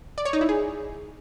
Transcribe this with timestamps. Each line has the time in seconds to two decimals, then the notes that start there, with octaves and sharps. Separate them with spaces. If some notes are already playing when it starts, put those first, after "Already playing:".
0.18 D5
0.25 C#5
0.33 D#4
0.41 E4
0.49 G#4